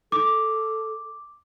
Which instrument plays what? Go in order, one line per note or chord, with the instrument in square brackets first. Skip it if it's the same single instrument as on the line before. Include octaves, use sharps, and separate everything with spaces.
[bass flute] A4 [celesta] D6